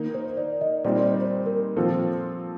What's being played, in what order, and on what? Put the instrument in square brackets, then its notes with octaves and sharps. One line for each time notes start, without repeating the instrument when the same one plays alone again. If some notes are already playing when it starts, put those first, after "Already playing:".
Already playing: [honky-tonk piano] D#3 A#3 D#4
[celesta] C5
D5
D#5
[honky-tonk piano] A#2 G3 C4 D#4 [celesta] D5
[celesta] C5
A#4
[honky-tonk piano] A#2 F3 C4 F4 A4